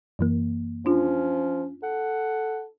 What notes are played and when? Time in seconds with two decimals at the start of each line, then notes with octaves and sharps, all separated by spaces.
0.19 F#2 E3 A#3
0.86 F3 C#4 D4 F4
1.84 A4 F#5